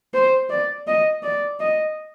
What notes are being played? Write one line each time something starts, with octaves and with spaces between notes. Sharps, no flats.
C5
D5
D#5
D5
D#5